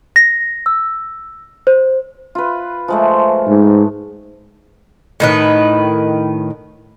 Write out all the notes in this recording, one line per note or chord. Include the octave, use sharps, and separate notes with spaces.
A#6
E6
C5
F4 B4
F3 G#3 A3
G#2
A2 D#3 B4